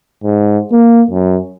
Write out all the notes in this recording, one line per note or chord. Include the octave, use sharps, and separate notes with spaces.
G#2
A#3
F#2